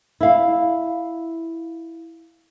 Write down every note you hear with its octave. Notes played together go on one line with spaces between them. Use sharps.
E4 F5